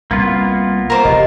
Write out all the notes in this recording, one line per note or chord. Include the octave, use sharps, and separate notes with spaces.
C2 A#3 B3 F4
A#4 C5 D6
F1 F2 G4 D#5